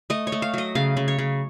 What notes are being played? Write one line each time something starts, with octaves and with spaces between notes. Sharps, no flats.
A3 D#5
C#5
A3
F5
F#3 D#5
C#3 F5
C#3
C#5
C#3